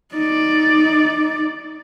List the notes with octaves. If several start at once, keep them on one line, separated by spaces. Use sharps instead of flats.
D#4 D5